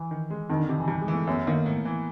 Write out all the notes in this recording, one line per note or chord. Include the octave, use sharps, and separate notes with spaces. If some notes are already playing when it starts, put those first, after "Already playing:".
Already playing: E3
D#3
G#3
F2 D#3
D3
C3 D#3
E3
G2
G#3
E3
A3
F#2 B3
D#3 A#3
A2
E3